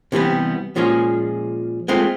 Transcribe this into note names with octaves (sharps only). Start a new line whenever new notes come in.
C3 E3 G3 B3
A#2 F3 G#3 C#4 G#4
G#3 A3 C4 F4